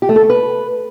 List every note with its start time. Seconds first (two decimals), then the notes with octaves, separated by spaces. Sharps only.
0.02 G4
0.09 A3
0.16 A4
0.23 A3
0.30 B4